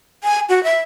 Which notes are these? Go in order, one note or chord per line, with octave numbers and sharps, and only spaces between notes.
G#5
F#4
E5